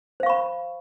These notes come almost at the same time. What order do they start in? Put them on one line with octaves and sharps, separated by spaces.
C5 F5 C#6 B5